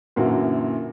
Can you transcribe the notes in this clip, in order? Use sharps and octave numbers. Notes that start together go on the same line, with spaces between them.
F#2 A#2 D3 E3 A#3 F#4